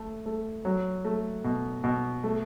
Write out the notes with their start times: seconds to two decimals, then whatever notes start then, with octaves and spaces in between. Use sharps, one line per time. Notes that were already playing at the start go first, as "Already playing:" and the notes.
Already playing: A3
0.26 A3
0.65 F#3
1.05 A3
1.44 B2
1.84 B2
2.24 A3